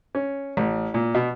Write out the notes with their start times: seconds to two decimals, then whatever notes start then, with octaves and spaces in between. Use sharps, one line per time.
0.15 C#4
0.57 A1
0.94 A#2
1.14 B2